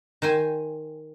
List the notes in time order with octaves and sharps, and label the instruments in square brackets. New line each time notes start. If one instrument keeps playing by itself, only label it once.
[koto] D#3 C5 G5 G#5